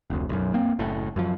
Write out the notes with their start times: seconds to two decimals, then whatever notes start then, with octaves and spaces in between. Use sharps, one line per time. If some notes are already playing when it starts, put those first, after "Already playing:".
0.10 F1 D2
0.29 B1 F#2
0.54 A#3 C4
0.79 F#1 A2
1.16 F#2 F3